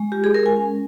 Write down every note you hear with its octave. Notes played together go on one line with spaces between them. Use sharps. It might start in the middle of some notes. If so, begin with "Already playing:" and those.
Already playing: G#3
F4 G4
G#4
G#3 A#4
G#5
C#4